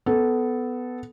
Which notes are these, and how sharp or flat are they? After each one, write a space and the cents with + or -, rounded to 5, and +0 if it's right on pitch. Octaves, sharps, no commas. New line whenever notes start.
B3 +10 A4 -10